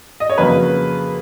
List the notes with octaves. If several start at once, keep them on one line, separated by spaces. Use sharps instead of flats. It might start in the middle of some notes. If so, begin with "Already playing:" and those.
D#5
C#5
F2 C#3 F#3 A#3 B4